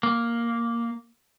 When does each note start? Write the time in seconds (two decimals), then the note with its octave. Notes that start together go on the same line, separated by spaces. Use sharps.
0.03 A#3